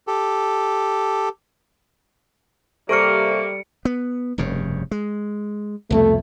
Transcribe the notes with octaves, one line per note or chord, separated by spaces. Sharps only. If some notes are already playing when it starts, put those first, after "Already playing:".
G4 A4
C3 G3 A#3 A4 C#6 F6 C#7 D7
B3
F1 G2 C#3
G#3
C2 F2 B2 A3